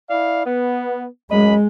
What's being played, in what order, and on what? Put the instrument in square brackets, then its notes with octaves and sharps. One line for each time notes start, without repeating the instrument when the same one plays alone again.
[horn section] E4 D5 F5
B3
[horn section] F#2 D#5 B5 [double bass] G#3